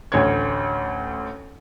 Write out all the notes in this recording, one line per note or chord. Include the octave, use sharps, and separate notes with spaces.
A1 D2 C#5 G#6